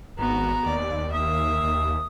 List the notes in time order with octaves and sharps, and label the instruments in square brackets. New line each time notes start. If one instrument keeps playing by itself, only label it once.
[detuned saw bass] G#1 [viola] B3 F#4 [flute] A#5
[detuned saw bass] D#2 [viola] D5
[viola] A#3 E5 [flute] D#6
[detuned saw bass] D#2